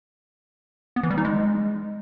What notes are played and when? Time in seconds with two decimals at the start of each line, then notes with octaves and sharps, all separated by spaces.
0.96 B3
1.03 E3
1.10 G3
1.18 D#4
1.25 G#3